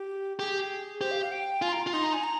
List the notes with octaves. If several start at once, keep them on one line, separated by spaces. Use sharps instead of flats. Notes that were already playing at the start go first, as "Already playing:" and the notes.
Already playing: G4
G4 G#4
G4 C5
F5
F5
G5
F4 G#5
C6
A#5
F4
D#4 C6
A#5
G#5
A#5